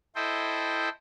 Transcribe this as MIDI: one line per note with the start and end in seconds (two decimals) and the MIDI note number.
0.15 0.89 64
0.15 0.89 69
0.15 0.89 72
0.15 0.89 75
0.15 0.89 79